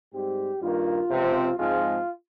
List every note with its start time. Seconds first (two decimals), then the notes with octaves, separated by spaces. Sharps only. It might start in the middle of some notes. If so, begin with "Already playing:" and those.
0.13 G#2 G3 C4 G4
0.61 G2 D#3 A#3 F4
1.10 C#2 C3 F3 C4
1.58 G#2 F3 G#3 C4 F4